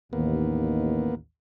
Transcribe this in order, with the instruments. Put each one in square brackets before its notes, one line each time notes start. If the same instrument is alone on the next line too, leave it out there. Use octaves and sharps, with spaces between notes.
[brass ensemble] A1 D#2 [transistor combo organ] A#3 B3